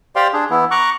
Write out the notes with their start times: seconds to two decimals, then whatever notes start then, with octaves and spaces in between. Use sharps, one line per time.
0.16 G4 C5 D5 F5 G5 C6
0.33 D4 G#4
0.50 E3 B3 E4
0.71 A#5 C#6 D6 F#6